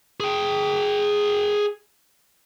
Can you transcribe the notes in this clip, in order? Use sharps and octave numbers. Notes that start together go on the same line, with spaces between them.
G#4 G5